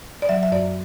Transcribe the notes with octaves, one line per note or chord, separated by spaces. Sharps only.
D5
F#3 E5
E5
F#2 D5